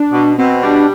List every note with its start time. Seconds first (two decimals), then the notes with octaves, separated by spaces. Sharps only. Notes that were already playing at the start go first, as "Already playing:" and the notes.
Already playing: D4
0.12 B2
0.38 B2 C4
0.63 G3 D4